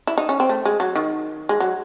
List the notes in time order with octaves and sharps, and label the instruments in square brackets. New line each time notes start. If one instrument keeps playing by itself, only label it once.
[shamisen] E4
D#4
C#4
C4
A3
G#3
F#3
D#3
G#3
F#3